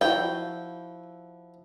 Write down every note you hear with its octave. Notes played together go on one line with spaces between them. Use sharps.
F3 E4 F#4 G5